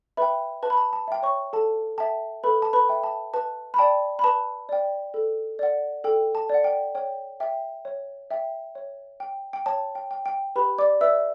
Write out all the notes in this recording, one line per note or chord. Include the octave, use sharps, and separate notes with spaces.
B4 E5 G5 B5
B4 A5
B5
A5
A5
E5 G5
C#5 C#6
A4 A5
E5 G5 A5
A4 B4 B5
A5
B4 B5
E5 G5
A5
B4 A5
B5
D5 G5 A5
B5
B4 A5
D5 G5
A4
D5 F#5
A4 G5
A5
D5 F#5
G5
C#5 G5
E5 G5
C#5
E5 G5
C#5
G5
G5
C#5 A5
G5
G5
G5
G4 B4 B5
D5 D6
B4 D5 E5 E6